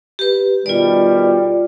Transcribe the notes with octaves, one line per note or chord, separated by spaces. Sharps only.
G4 B4
B2 D#3 G3 F4 D5